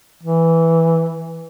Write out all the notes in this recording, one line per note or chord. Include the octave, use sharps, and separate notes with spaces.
E3